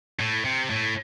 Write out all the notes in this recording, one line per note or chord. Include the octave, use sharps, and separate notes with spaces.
A2
C3
A2